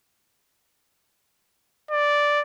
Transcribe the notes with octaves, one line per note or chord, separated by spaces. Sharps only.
D5